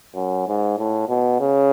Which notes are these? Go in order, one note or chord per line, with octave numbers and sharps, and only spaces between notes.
F#2
G#2
A2
B2
C#3